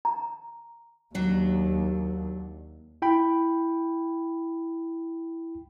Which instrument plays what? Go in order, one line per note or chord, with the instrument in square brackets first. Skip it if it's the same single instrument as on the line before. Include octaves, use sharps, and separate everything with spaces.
[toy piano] A#5
[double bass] D#2 [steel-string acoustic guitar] F#3 D4
[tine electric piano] E4 G5 B5